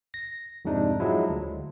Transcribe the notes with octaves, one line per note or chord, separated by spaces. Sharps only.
A#6
F2 G#2 C3 D4 D#4
F3 F#3 G#3 E4
D2